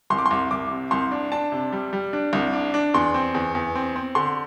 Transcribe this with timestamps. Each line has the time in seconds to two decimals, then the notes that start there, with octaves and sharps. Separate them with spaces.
0.10 C2 C6
0.18 D6
0.26 C6
0.31 C2
0.51 C2 D6
0.71 C3
0.91 C2 C6
1.12 D4
1.32 D4 A5
1.52 C3
1.72 G3
1.93 G3
2.13 D4
2.33 C2
2.53 D4
2.74 D4
2.94 E2 C6
3.14 C4
3.34 E2
3.55 E2
3.75 C4
3.96 C4
4.15 D3 C6